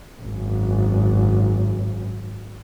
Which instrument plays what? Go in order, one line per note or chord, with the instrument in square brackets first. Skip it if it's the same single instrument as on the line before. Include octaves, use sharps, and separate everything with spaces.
[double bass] G#1 F#2